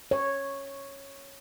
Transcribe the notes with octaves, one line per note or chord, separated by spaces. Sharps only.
C#5